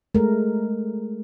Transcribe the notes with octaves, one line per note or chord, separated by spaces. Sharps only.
G#3 A3 A#4